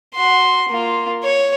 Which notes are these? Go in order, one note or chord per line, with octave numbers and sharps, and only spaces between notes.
F#4 C6
A#3 F4
C#5